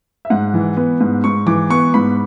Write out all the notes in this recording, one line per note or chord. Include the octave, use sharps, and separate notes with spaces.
E5
G#2 F#5
E3
B3
G#2
G#2 C#6
E3 D6
B3 C#6
G#2 B5